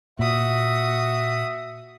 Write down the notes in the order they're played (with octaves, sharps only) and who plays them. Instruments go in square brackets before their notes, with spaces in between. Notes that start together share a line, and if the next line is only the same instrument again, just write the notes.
[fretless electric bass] A#2 [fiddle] F#4 D#6 [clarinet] E5